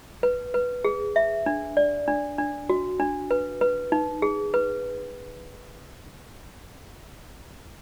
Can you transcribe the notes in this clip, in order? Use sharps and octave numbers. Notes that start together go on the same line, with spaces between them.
B4
B4
G#4
E5
D4
D5
D4
D4
F#4
D4
B4
B4
D#4
G#4
B4